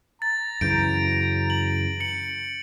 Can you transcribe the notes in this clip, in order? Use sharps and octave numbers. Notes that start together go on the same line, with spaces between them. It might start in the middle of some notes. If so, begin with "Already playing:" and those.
A#5 A6
F#2 C#3 E3 G6 D7
F#7
C#7 F#7